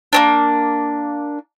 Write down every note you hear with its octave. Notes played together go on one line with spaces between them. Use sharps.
A#3 C4 D4